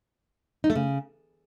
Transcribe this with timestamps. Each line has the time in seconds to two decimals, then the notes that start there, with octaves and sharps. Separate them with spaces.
0.64 D#4
0.70 A3
0.75 C#3